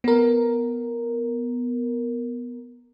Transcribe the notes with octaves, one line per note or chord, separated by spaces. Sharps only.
B3 A#4